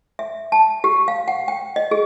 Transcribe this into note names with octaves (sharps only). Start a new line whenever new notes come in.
E5
A5
G4
F5
F#5
G5
D#5
G#4